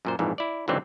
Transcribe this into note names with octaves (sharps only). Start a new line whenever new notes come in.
F#2 A#2 C5
A#1 F2 G#2 E3
E4 D5
C#2 G#2 D3 E3 F#3 C4